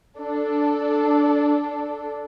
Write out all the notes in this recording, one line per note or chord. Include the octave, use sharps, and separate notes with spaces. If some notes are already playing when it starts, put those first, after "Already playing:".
D4 A4